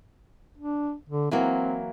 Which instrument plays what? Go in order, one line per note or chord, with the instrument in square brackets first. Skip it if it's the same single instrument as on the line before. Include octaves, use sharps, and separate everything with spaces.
[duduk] D4
D3
[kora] E3 F#3 A#3 [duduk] C4